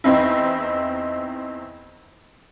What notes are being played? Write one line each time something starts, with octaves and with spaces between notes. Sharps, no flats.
E2 C4 D#4 E4